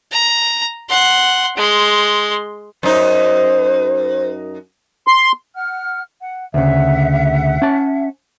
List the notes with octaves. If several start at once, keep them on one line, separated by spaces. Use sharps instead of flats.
A#5
F#5 C6
G#3 C6
F#2 D#4 C5
C6
F#5 F6
F#5
D2 C#3 E5 F#5
C#4 A5